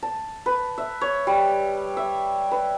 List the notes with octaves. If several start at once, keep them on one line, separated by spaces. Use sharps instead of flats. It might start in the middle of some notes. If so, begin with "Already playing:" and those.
A5
B4
E5
C#5
G3
E5
B4